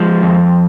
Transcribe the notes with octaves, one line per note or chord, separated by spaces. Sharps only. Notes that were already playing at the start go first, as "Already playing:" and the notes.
Already playing: F3 G#3
F2